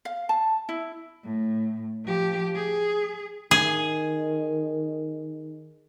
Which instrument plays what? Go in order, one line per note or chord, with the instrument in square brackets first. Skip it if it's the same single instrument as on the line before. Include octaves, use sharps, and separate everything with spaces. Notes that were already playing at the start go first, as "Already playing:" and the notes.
[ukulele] F5
A5
E4
[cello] A2
F3 G4
G#4
[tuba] D#3 [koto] G#4